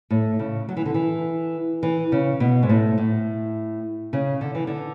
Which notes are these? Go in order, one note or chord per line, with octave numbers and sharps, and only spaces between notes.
A2
C#3
F#3
E3
D3
E3
E3
C#3
B2
G#2
A2
A2
C#3
D3
E3
D3